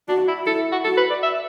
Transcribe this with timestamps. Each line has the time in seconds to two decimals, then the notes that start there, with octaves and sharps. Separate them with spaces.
0.08 D4 F#4
0.28 E4
0.46 E4 A4
0.72 F#4
0.84 F#4 A4
0.97 B4
1.10 D5
1.23 E5